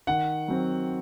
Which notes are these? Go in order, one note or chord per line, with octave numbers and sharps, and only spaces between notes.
D#3 F#5
F#3 C4